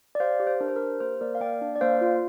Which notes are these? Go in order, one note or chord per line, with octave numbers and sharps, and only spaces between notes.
D5
G4 C5 F5
G4
C5
D4 A#4
C5
A#4
G4
A#3 C5
A#3 A#4 D5
F5
A#3 D5 G5
D4
D5
A#3 C5 F5
F4